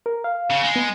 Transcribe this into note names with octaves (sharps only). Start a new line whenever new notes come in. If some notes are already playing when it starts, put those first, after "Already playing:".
A#4
F5
C#3
G#3
B3 C#7